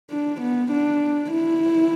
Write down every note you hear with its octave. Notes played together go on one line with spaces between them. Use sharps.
D4
B3
D4
E4